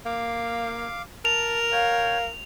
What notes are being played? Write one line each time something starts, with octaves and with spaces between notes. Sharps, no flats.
A#3 F5 D6
A#4 A5 F7
C#5 F5 G5